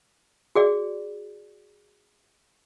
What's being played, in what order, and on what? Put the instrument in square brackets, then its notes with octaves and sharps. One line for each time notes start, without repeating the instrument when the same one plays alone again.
[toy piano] F#4 G#4 D5